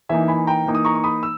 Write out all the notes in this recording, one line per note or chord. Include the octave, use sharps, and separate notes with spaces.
E3 A#3 D#4 E5 G#5
G#5 B5
G5 A#5
E3 A#3 D#4
D#6
A#5 C#6
C#6
B5 D#6
E6